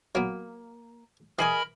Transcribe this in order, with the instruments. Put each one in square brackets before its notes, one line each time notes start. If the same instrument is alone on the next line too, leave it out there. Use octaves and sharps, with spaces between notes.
[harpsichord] F#3 B3 [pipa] A#3
[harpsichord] E3 D6 [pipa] G#4 D#5 G#5 [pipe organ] A#4 B5